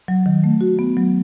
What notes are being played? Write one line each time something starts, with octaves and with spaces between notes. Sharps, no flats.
F#3
D#3
A3
F#4
B3
F#3